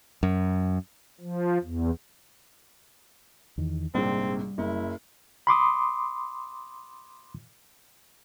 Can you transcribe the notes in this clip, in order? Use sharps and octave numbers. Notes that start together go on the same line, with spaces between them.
F#2
F3
E2
E2 D#3
A#1 G#2 C3 G3 C4
F#1 E4
B5 C6 D6 D#6